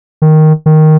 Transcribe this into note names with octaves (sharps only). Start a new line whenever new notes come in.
D#3
D#3